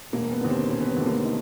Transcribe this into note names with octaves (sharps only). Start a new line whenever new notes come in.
E1 A#3
B3
D#2 D3
C4
E1 C#4
B3
C4
D#2 D3 A3
A#3
D#4